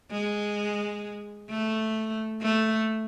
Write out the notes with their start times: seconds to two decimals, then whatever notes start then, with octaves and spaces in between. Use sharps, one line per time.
0.11 G#3
1.49 A3
2.42 A3